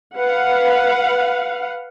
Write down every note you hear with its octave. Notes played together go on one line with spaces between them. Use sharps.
B4 F5 F#5